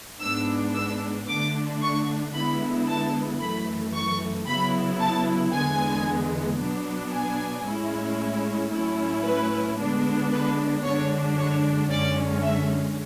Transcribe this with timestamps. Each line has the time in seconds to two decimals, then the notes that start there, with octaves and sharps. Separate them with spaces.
0.22 G#2 G#3 B3 D4 E6
0.75 E6
1.28 D3 A3 D4 D6
1.82 C#6
2.34 D3 G#3 B3 E4 B5
2.88 A5
3.40 F#2 E3 A3 B5
3.94 C#6
4.47 C#3 F#3 B3 E4 B5
5.00 A5
5.53 E2 D3 G#3 B3 G#5
6.59 B2 F#3 B3 D4
7.13 G#5
7.65 A2 G#3 C#4 E4
8.72 A2 F#3 A3 C#4 E4
9.24 B4
9.78 D3 G#3 B3 D4
10.31 B4
10.84 F#2 D3 G#3 D4 C#5
11.37 C#5
11.90 F#2 D3 G#3 C#4 D5
12.43 E5